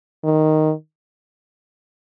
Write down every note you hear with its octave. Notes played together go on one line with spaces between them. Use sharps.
D#3